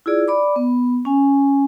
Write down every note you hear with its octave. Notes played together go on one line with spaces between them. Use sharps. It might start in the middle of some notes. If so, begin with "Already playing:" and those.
E4 F4 G#4 D5
D5 B5 D6
B3
C#4 G#5